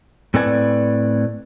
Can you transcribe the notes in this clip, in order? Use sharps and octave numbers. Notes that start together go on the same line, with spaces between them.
A2 C4 A4 B4 D5 G#5